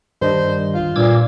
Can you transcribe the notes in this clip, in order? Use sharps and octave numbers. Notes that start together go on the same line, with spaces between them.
G2 D#3 G3 D4 C5 D#5
F4
G2 A#2 D6 E6 G#6